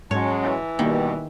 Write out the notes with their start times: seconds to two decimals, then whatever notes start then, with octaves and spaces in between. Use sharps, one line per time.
0.11 G#2 F#3 G#3 C#4 C#5 A5
0.42 E3
0.79 B2 D#3 G3 A#3 G4